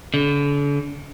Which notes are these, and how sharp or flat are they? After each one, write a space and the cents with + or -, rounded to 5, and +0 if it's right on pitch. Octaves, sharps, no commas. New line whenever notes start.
D3 -40